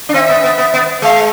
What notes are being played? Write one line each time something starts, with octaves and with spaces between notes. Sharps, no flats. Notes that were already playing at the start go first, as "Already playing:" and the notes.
D4
C4 F5
E5
B3
B3
B3
B3
G#3 F5